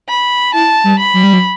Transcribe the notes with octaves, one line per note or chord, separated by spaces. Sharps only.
B5
E4 A5
G3
B5
F#3
G3
F#3